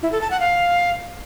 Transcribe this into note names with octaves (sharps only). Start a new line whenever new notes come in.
E4
A4
A5
F#5
F5